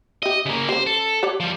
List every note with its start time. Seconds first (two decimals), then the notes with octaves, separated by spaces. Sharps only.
0.23 G4 D#5 E5
0.46 C#3 A#3
0.69 G3 C#4 C5
0.87 A4
1.23 G4 C#5 D5
1.40 F3 G3